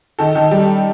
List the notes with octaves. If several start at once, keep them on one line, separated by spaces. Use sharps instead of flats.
D#3 A4
D#3
G3